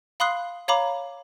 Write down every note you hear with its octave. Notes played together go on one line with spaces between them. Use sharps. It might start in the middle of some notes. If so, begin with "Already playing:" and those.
F5 B5 C6 D#6 F#6 C7
C#5 F5 A#5 B5 D6